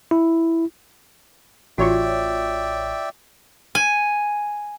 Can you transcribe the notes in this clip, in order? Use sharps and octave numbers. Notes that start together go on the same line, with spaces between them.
E4
A1 F4 F#4 C#5 D5 E5 G5
G#5